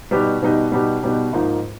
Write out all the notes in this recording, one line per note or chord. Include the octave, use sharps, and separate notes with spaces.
B2 G3 B3 D#4 G4
B2 G3 B3 D#4 G4
B2 G3 B3 D#4 G4
B2 G3 B3 D#4 G4
G#2 F3 A#3 D#4